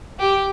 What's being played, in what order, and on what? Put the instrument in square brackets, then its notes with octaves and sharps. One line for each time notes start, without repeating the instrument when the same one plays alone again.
[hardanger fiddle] G4